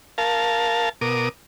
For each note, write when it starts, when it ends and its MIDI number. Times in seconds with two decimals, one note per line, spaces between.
0.18 0.89 70
0.18 0.89 77
0.18 0.89 81
1.01 1.29 47
1.01 1.29 70
1.01 1.29 86
1.01 1.29 87